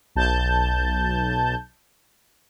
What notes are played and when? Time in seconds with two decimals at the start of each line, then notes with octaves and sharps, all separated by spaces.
0.16 B1 A5 G6